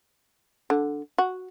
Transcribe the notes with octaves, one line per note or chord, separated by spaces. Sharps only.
D3
F#4